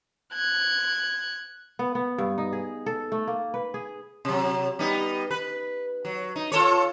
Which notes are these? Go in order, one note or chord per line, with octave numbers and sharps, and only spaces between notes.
F#6 G#6
B3
B3
G2
D#4
G#4
A4
A3
A#3
B4
G#4
C3 F#3
G3 B3 D#4
B4
F#3
D#4
F4 A4 C#5